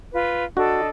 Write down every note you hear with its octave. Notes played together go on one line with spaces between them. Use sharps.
F4 B4
D4 F#4 A4 D#5